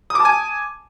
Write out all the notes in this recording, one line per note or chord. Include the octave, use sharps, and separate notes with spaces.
G#5 A5 D6 D#6